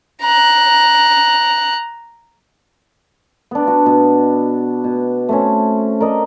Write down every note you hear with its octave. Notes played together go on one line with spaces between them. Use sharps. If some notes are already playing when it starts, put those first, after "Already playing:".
A#5 F#6
B3 D4
F#4
B2
B2
A3 C4 C#4
A#4 D5 D#5